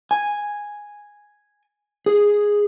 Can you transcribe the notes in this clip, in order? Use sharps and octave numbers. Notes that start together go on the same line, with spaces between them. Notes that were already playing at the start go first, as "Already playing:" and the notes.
G#5
G#4